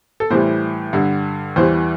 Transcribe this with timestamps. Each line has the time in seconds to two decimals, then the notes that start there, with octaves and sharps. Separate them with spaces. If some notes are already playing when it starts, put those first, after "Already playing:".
0.20 A4
0.30 A2 E3 G3 C5
0.93 G2 D3 G3
1.56 E2 E3 G3 C5